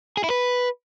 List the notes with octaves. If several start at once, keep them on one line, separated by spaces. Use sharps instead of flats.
G#4
E4
B4